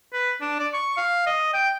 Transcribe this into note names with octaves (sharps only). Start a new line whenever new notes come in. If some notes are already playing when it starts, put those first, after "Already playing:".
B4
D4
D5
C#6
F5
D#5
G5